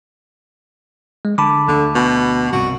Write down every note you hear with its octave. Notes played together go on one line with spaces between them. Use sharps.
G#3
D3 A5 B5 D6
D2 D3
B2
C2 G2 B2 F#4